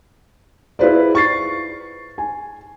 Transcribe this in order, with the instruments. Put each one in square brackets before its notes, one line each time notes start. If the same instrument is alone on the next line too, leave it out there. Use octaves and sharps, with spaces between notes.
[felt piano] E4 F4 G#4 B4 C5 D5
C#6 A6 C7
G#5